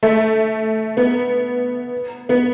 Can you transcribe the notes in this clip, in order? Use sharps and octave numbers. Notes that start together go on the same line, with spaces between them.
A3
B3
B3